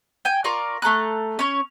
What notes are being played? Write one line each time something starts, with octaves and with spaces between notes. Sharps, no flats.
G5 G#5
F4 A#4 D5 C#6
A3 A4 A#5 F#6
C#4 C#5